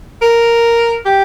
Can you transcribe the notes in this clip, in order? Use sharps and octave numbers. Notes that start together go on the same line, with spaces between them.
A#4
G4